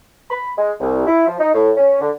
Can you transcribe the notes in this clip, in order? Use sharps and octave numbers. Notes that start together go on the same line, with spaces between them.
B5
G#3
C2
E4
F3
D#4
A2
C#4
D3